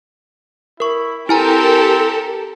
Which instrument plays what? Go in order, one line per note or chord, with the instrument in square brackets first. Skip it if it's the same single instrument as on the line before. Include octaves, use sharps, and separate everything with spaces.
[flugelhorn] E4 [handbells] A#4 C#6
[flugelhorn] C4 [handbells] E4 G#5 A#5 [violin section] G4 A4 A#4